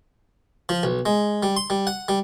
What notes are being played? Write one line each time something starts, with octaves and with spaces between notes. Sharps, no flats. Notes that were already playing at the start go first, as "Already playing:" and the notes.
F3
B1
G#3
G3
C6
G3
F#5
G3